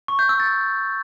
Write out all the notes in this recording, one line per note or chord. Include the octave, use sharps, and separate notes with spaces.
C#6
G6
E6
A6